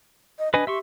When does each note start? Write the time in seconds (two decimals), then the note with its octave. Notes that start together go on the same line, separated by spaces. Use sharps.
0.39 D#5
0.54 D4 B4 D#5 G#5
0.67 G4 E5 C6 C#6